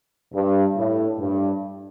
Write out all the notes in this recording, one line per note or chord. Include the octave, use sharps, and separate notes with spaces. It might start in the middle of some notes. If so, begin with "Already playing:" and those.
G2
A2
G2